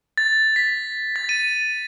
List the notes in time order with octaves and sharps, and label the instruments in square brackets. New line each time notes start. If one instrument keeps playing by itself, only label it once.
[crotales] A6
B6
A6
D#7